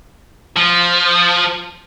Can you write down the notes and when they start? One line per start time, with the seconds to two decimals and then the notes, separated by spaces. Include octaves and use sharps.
0.56 F3